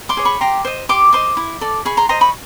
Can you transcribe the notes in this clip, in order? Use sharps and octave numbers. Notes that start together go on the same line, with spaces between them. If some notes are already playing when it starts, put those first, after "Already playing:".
C6 D6
G#4 C#5
B5 C#6
G4 A#5 C6
C5 D#5
G4 C6 D6
C5 D#5 C6 D6
E4
A4 D5
G#4 B5 C#6
A#5 C6
C5 D#5 A#5 C6
B5 C#6